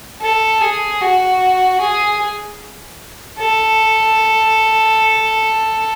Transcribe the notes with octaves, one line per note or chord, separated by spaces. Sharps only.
A4
G#4
F#4
G#4
A4